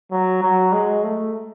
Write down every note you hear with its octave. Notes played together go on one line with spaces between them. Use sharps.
F#3
F#3
G#3
A3